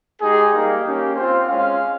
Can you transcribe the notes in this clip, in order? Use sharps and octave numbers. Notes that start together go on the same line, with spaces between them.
G#3 D#4 G4 G#4
G3 A#3 D#4 G4
A#3 C#4 G4
C4 F4 C5
G#3 C#4 F4 F5